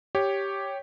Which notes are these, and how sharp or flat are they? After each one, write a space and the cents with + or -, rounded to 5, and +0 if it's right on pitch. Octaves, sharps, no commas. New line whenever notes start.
G4 +0 C#5 +0